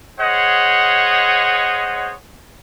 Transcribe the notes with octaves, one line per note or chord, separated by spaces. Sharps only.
G#4 C5 C#5 D#5 F#5